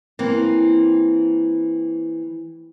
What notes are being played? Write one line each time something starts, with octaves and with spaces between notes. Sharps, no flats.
E3 A#3 C4